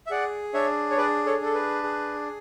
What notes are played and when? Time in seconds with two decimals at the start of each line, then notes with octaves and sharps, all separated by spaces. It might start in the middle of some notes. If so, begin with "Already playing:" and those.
0.07 E5
0.11 G#4 D5 F#5
0.54 D4 C#5 E5
0.91 C#5
0.97 G#4 B4 D5
1.26 A4 C#5
1.41 D4 A4
1.54 B4
1.83 G#4